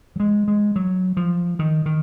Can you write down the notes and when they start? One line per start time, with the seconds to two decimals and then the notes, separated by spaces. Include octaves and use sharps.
0.16 F#3
0.20 G#3
0.48 G#3
0.76 F#3
1.17 F3
1.59 D#3
1.86 D#3